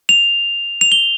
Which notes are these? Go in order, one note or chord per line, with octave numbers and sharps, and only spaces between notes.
F7
F7
G7